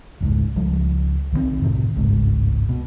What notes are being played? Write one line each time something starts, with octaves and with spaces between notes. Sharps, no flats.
F1 C#2 G#2
C#2 F3 G3
B1 D#3 G3 C4
F#2 A2 C3 D#3
G1 C#2 G#2
B2